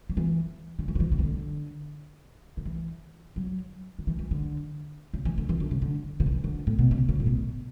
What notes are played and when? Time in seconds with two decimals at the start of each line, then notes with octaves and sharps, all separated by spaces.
0.09 F#3
0.17 E3
0.79 D3
0.88 E3
0.95 D3
1.00 E3
1.12 D3
1.19 E3
1.23 D3
2.57 D3
2.65 E3
3.36 F#3
3.99 D3
4.07 E3
4.19 E3
4.31 D3
5.14 C#3
5.25 E3
5.38 D3
5.49 E3
5.60 D3
5.71 C#3
5.82 D3
6.20 C#3
6.26 D3
6.32 E3
6.44 D3
6.67 A2
6.79 B2
6.91 C#3
7.09 C#3
7.20 A2
7.26 B2